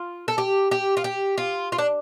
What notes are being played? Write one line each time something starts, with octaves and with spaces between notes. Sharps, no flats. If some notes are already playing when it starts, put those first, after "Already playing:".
Already playing: F4
A4
G4
G4
F4
G4
F4
F4
D4